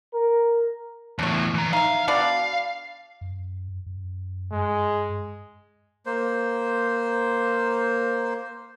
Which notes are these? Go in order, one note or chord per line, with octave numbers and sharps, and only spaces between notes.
A#4
E2 A2 D4 C#5
E3 A#5
D#4 E5 F5
B2 D4 D5 F5
F#2
F#2
G2 G#3
A#3 C5